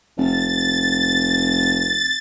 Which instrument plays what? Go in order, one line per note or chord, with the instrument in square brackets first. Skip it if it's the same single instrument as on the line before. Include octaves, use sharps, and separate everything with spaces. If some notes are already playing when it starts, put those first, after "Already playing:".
[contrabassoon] F1 [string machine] A6